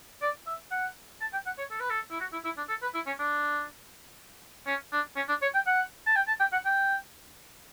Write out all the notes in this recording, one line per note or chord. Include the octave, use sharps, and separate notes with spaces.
D5
E5
F#5
A5
G5
F#5
C#5
A4
B4
A4
E4
F#4
E4
E4
D4
A4
B4
E4
C#4
D4
C#4
D4
C#4
D4
C#5
G5
F#5
A5
G5
A5
G5
F#5
G5